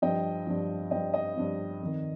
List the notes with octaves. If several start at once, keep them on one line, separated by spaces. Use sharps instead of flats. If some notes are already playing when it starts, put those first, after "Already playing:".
G2 F3 D#5 G5
G2 F3
G2 F3 D#5 G5
D#5
G2 F3
F2 D#3